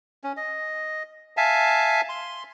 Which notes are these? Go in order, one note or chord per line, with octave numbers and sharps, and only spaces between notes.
C#4
D#5
E5 F5 G#5 A5
C6